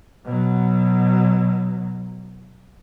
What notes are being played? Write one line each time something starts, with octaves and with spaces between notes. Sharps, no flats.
B2 F#3